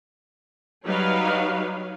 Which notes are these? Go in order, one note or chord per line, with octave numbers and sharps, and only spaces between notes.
F#3 G3 D#4 B4 C#5 F5